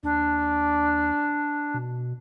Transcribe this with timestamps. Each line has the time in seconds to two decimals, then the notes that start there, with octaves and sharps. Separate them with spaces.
0.03 D#2 D4
1.74 B2